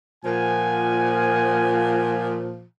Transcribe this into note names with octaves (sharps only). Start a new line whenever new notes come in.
A#2 F3 F#5 G#5